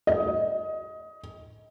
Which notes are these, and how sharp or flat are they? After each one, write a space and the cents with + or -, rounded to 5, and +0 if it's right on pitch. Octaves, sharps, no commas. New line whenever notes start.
D#5 +20